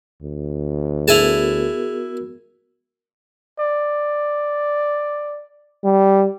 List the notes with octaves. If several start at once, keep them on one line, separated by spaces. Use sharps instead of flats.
D2
B3 E4 F#4 G#4 A#4 G#5 A5 F7
D5
G3